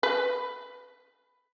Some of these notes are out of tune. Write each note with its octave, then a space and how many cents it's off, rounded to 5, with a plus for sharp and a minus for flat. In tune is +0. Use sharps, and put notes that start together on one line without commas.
B4 +5